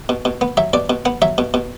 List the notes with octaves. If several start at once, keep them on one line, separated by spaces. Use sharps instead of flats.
B2
B2
B3
F#3 E5
B2 D5
B2
B3 F#5
F#3 E5
B2
B2